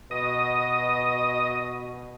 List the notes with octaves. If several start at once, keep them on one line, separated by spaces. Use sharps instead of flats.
B2 D#5